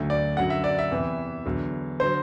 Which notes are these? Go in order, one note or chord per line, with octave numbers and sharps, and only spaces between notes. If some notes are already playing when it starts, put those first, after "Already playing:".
Already playing: D2 D3 F#3
D5
F#2 D3 F#3 F#5
E5
D5
E5
E2 C3 E3
E2 D3 F#3
D3 F#3 C5